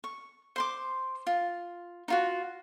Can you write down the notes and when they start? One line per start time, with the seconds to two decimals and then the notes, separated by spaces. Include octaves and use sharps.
0.04 C#6
0.56 C5 C6 D6
1.27 F4
2.08 D#4 F4 F#4